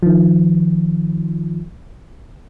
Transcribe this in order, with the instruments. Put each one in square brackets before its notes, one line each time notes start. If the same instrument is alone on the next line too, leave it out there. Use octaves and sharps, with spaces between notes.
[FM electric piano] D#3 F3